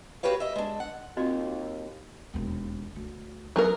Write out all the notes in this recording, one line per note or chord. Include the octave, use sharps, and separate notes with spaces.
F#4 G4 B4 C#5 F5
D#5 E5
G#3 D4
F#5
D#2 C4 F4 F#4 D#5
E1 D#2
D2
F#3 B3 A#4